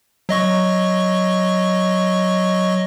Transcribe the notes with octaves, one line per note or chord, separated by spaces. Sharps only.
F#3 D#5 C#6